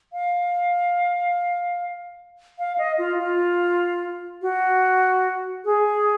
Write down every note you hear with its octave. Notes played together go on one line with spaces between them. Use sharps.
F5
F5
D#5
F4
F4
F#4
G#4